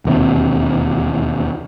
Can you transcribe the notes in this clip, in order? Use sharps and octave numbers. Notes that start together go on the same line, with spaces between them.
E1 D#2 C3